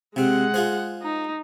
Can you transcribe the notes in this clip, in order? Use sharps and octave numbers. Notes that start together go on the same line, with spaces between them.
C3 G#3 C4 F#5
F4 G#4 C5
D#4